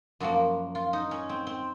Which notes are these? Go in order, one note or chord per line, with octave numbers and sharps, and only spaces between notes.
F#2 F3 A#3 F#4
F4
D#4
C#4
C4
C4